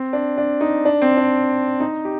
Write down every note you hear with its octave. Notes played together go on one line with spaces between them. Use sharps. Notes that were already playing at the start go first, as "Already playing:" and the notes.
Already playing: C4
D4
D4
D#4
D4
C4
D4
D#4
G4